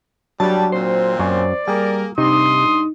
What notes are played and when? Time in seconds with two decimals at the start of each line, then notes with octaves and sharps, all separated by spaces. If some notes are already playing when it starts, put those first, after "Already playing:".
0.40 F#3 G3 D4 A5
0.72 A#2 C4 C5
1.19 F#2 C#5 D5 G#5
1.68 G3 A#3 G#4 A#4
2.18 G2 C3 D#4 C6 D#6